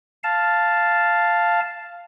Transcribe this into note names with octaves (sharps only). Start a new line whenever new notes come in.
F5 A5